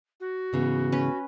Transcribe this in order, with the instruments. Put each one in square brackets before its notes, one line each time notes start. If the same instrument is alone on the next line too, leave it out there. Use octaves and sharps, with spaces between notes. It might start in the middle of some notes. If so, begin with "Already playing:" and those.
[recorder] F#4
[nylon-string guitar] G#2 C#3 E3 [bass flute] B3
[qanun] C#4 B4